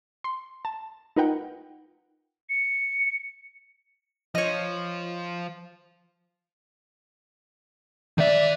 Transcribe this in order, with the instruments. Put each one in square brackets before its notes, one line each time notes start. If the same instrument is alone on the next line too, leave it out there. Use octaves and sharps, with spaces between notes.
[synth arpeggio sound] C6
A5
D#4 F4 A#4 B4 F#5 G5
[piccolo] C#7
[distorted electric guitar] F3 [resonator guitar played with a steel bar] C#5 D#5
[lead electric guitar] D#3 E5 [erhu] D5